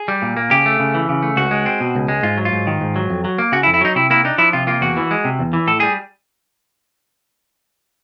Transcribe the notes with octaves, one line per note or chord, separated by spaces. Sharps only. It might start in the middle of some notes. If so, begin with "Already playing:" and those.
Already playing: G#4
G3
A#2
A#3
C#3 G4
A3
C#3
E3
C#3
A3
C#2 F#4
G#3
C4
B2
C#2
G#3
G#2 F4
F#3
F4
G#2
D#3
G#2
F#3
F2
F#3
A#3
C#3 F#4
E4
F2
E4
F#3 D#4
C3 E4
A#3 E4
D4 D#4
F3 E4
C3 F4
A#3 F4
E2 F#4
E3
G#3
C3
E2
E3
A2 A4
G3 G#4